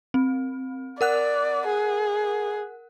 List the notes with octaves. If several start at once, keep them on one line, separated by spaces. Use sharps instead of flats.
C4
A#4 D5 F#5 F#6
G#4